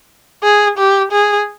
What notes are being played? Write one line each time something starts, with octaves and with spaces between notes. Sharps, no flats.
G#4
G4
G#4